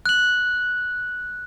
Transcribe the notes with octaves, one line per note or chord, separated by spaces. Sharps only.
F#6 F#7